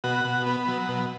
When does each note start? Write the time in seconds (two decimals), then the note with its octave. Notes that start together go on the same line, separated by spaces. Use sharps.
0.04 B2 F#4
0.25 B2
0.46 B3
0.68 F#3
0.89 B2